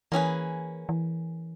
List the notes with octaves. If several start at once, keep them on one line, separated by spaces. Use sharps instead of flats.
E3 A#3 C#4 G#4 B4
E3